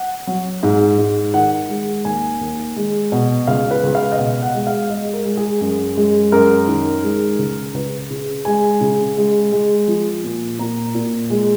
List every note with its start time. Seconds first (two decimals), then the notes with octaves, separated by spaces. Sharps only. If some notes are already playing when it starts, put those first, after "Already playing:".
Already playing: F#5
0.27 F#3
0.63 G#2
0.98 G#2
1.34 D#3 F#5
1.69 G#3
2.05 D#2 G#5
2.41 D#2
2.76 G#3
3.12 B2
3.47 C#2 F5
3.71 B4
3.83 C#2
3.95 F5
4.12 D#5
4.18 B2 F5
4.42 F#5
4.55 G#3
4.67 F5
4.90 G#3 D#5
5.13 A#4
5.26 G#3
5.37 G#4
5.61 F#2
5.97 G#3
6.32 F#2 A#4
6.68 D#3
7.03 G#3
7.39 C#2
7.74 C#2 B4
8.10 C#3
8.45 G#3 G#5
8.81 C#3
9.17 G#3
9.52 G#3
9.88 F3
10.24 A#2
10.59 A#2 A#5
10.95 A#2
11.30 G#3